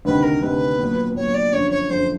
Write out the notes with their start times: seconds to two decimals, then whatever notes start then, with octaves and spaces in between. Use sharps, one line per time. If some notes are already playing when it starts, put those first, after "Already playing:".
0.05 D2 C3 D#3 B4
0.23 A#4
0.41 D2 C3 D#3 B4
0.79 A#2 F#3 B3
1.16 A#2 F#3 B3 C#5
1.34 D5
1.53 G1 F#2 D3 F3 C#5
1.71 C#5
1.90 G1 F#2 D3 F3 C5